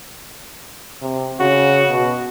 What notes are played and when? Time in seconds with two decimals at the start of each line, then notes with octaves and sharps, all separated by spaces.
1.02 C3
1.40 C#3 F#4
1.89 B2